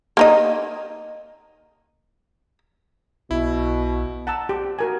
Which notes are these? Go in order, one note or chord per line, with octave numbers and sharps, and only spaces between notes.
A#3 D#4 D#5
B1 B2 E4
F#5 A5 A#5 E6
G4
F#4 A#4 G#5